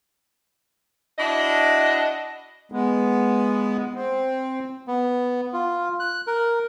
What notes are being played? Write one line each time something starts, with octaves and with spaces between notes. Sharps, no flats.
D4 E4 F#4 D#5
G#3 B3
C4
B3
F4
F#6
A#4